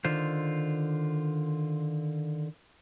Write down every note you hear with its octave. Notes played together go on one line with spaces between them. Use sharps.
D3 D#3 F4 C5